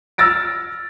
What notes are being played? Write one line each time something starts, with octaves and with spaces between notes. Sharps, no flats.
E6 F6 A6 A#6 D7